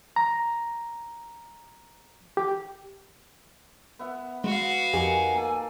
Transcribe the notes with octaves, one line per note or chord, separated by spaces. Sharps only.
A#5
G4
B3 E5 F#5
G#3 F#4 F5
F2 D#3 G4 G#5
A#3 A4